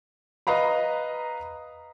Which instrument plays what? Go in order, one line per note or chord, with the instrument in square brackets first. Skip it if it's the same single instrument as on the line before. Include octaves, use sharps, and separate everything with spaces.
[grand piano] B4 D#5 F5 A#5 B5